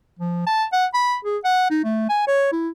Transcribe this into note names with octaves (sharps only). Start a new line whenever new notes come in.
F3
A5
F#5
B5
G#4
F#5
D#4
A3
G#5
C#5
E4